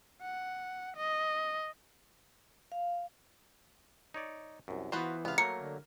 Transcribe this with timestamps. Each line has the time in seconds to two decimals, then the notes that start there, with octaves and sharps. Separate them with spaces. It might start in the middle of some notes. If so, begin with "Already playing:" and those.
0.22 F#5
0.96 D#5
2.72 F5
4.14 D#4 C#5 D5
4.68 C2 F#2
4.92 E3 B3 F4 F#4 B4 C5
5.25 C#2 C3 B3 F5
5.38 F#3 A3 A#3 A#4 C#7
5.61 D3